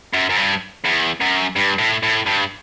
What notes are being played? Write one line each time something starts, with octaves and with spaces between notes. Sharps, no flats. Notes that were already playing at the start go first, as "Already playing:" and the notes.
F#2
F#2
G2
E2
F#2
G2
A2
A2
G2